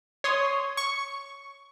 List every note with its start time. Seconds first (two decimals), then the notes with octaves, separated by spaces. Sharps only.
0.24 C#5 C6 D#6
0.77 C#6